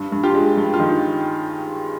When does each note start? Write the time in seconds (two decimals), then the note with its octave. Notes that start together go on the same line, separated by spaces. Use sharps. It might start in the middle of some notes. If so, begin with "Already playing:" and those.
Already playing: G2
0.12 G2
0.23 F4 G4
0.35 G#3
0.57 G2
0.74 F4
0.80 D#3